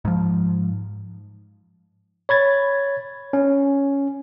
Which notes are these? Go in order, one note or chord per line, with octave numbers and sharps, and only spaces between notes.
G#2 F3
C#5 B5 G#6 A6
C#4